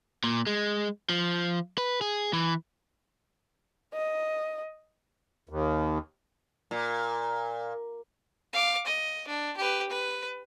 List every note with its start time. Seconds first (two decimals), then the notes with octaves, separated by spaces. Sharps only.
0.24 A#2
0.47 G#3
1.09 F3
1.78 B4
2.01 G#4
2.33 E3
3.94 D#5
5.49 D#2
6.71 A#2
8.53 F5 D6
8.86 D#5
9.27 D4
9.57 G4 B4
9.89 B4